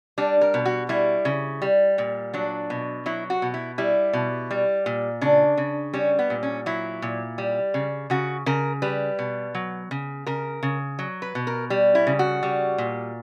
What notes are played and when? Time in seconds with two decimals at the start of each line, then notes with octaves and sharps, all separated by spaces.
0.18 G3 D4
0.41 A#4
0.54 B2
0.66 F#4
0.89 G3 E4
1.25 C#3
1.62 G3
1.98 A#2
2.34 F#3 D4
2.70 B2
3.06 F#3 E4
3.30 F#4
3.42 B2
3.54 E4
3.78 G3 E4
4.13 B2
4.51 G3
4.86 A#2
5.21 C#3 D4
5.57 C#3
5.93 G3 C#4
6.19 B3
6.30 A#2
6.43 C#4
6.66 F#3 E4
7.02 A#2
7.38 G3
7.74 C#3
8.10 C#3 F#4
8.46 C#3 A#4
8.82 G3 B4
9.19 B2
9.55 F#3
9.91 C#3
10.26 C#3 A#4
10.63 C#3
10.99 F#3
11.22 B4
11.35 B2
11.47 A#4
11.70 G3
11.95 E4
12.07 C#3
12.19 F#4
12.43 G3
12.78 A#2